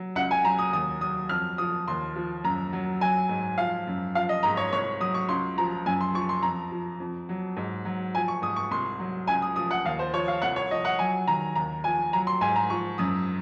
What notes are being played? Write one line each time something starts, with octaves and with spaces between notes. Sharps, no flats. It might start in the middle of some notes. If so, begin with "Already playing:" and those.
Already playing: F#3
C#2 F#5
G#5
F#3 A#5
D#6
D#2 D#6
F#3 D#6
F2 F6
F3 D#6
D#2 C6
F3
F#2 A#5
F#3
F#3 G#5
G#2
F3 F5
F#2
F3 F5
D#5
G#2 A#5
C#5
C2 C#5
F#3 D#6
C#6
C#2 C6
F3 A#5
F#2 G#5
C6
F3 C#6
C6
F2 A#5
F3
F2
F#3
G#2
F#3
F3 G#5
C#6
G#2 D#6
C#6
C2 C6
F#3
C#2 G#5
D#6
F3 D#6
F#5
D#2 F5
C5
F3 C#5
F5
C2 F#5
C#5
F3 D#5
F#5
F#3 G#5
D#3 A#5
D#2 A#5
F3 G#5
F#3 A#5
C6
G#2 G#5
A#5
F3 C#6
F#2 D#6